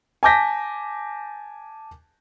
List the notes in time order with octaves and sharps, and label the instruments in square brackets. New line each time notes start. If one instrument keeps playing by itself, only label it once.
[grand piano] G#5 A5 D6 G6 A#6 B6